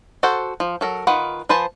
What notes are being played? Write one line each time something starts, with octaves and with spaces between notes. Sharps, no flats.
F#4 A4 C5 F#5
F3
F#3 A4 A#4
D#3 F4 B4 F#5
F3 B4 C5 G#5 A5